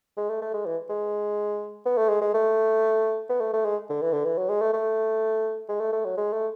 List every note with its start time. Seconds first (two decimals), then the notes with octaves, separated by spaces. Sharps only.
0.17 G#3
0.30 A3
0.42 A3
0.54 G#3
0.66 E3
0.90 G#3
1.86 B3
1.97 A3
2.09 G#3
2.21 G#3
2.34 A3
3.29 B3
3.41 A3
3.53 A3
3.65 G#3
3.89 D3
4.01 E3
4.13 D3
4.25 E3
4.38 F#3
4.49 G#3
4.61 A3
4.73 A3
5.69 G#3
5.81 A3
5.93 A3
6.05 F#3
6.17 G#3
6.33 A3